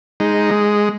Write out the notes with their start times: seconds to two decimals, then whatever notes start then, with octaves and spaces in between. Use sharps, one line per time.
0.20 G#3 D#4
0.51 G#3